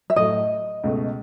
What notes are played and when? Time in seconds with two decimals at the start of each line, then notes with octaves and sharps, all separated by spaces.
0.10 E5
0.16 A2 F#3 A3 D#5
0.84 C#2 B2 A3